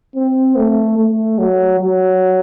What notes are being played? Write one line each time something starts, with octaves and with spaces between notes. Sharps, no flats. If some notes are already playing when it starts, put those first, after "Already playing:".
C4
A3
A3
F#3
F#3